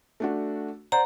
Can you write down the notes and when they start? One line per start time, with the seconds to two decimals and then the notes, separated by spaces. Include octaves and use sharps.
0.20 A3 D4 F#4
0.92 C5 D5 F#5 A#5